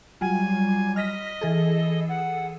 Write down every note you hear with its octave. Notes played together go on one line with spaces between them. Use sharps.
F#3 G3 F4 G#5
D#5 F6 A#6 B6
E3 G#4 A4
F#5